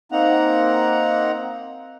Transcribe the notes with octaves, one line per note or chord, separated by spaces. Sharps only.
A#3 C4 D#4 F#5 A#5